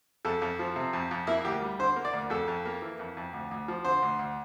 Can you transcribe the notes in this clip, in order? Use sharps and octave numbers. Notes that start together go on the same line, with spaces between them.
F2 A4
F2
F3
C3
F2
F2
A#3 E4
D2 G4
G3
D3 C5
A#3
D5
D2
F2 A4
F2
A#3
E3
F2
F2
D2
D2
F3
D3 C5
D2
D2